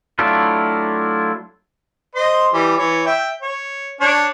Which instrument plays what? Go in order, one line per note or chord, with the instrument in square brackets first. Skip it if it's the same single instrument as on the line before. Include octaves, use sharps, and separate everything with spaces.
[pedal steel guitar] F#3 A3 D4 E4 F4
[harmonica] C5 D#5 C6
E3 G3
E3 C#5
E5 G5
C#5
D4 C#5